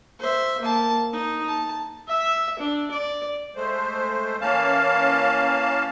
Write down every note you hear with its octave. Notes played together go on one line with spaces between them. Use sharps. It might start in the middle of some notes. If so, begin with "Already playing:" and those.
C5 E5
A#3 A5
D#4
A5
E5
D4
D5
G#3 A3 C5
E3 A#3 C#4 F5 A5